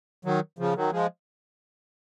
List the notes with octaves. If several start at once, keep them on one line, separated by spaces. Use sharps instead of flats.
D#3 F#3
C#3 F3
D#3 F#3
F3 G#3